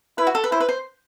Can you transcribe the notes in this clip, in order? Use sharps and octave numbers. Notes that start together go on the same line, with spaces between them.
E4 B4
F#4
A4
B4
E4 C5
B4
C5